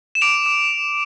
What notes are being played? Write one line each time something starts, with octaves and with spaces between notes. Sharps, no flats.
E7
D6 D7 F7
D6